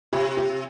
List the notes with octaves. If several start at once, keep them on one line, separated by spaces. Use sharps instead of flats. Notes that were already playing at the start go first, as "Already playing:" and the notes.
C3 G4
G4